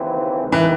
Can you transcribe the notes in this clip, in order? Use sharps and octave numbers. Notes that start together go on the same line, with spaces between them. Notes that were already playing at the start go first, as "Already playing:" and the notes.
Already playing: D#2 C#3 E3 C4
C2 C3 D#3 G#3
E3